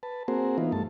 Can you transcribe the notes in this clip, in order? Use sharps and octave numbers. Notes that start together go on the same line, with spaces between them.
B4 A5
A#3 C4 F#4 G#4 A#4 C5
E3 B3 D#4 F4
G2 A3 A5